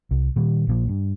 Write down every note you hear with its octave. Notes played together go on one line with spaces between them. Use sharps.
C2
A#2 D#3 G3
A#1 A#2 F3
G2